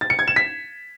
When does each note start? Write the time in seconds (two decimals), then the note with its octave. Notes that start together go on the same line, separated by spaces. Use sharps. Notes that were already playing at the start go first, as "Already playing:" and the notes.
0.01 A6
0.10 C#7
0.19 G#6
0.28 E7
0.36 B6